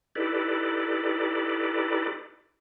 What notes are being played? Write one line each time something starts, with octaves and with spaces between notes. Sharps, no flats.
D#4 E4 G4 A4 B4 D5